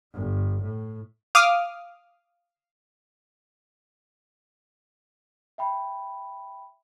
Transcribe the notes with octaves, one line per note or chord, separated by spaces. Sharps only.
G1
A2
F5 D6 D#6 F6
E5 G5 B5